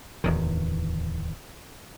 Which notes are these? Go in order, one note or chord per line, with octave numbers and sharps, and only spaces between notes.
D1 E2 D#3